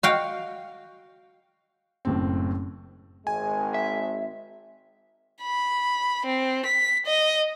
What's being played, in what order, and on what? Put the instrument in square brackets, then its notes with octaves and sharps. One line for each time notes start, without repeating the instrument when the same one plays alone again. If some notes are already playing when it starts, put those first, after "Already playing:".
[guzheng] F#4 F5 G5
[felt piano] F#1 A2 C4
[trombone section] G#1 G#3 [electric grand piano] G#5
[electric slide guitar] E5
[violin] B5
C4
B6
D#5